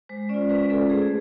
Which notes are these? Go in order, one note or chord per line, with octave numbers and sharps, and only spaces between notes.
G#3 C5
C#4 F4 D5
G#3 B4
C#4 F4 A4
A3 G#4
G#4